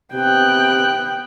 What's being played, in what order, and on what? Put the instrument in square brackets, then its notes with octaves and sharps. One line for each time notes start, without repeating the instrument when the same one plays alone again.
[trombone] C3 [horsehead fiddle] B3 G5 [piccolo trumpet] F#6